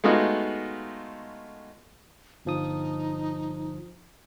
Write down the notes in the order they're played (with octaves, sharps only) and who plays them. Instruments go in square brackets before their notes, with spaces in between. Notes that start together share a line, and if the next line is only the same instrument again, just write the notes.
[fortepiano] G#3 A3 B3 D#4 F4 F#4
[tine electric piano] G1 F3 D#6 [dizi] D#4